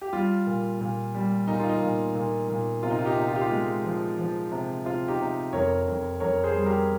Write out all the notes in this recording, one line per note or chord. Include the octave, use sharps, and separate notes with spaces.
G4
G3 F4
A#2
A#2
G3
A#2 D#4
F4
D#4
A#2
A#2
A#2
C3 F4
D#4
F4
D#4 G4
C3
F4
G4
F4
G#3
F3
F3
C3
C3 F4
D#4 G4
C3
F2 A#4 C#5
F2
F2 A#4 C#5
G#4 C5
G3
G4 A#4